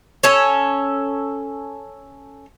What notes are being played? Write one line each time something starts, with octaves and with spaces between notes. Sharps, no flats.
C#4 A4 C#5